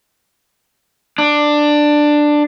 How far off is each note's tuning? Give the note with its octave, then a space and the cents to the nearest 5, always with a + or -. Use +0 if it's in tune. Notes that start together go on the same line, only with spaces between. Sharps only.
D4 +10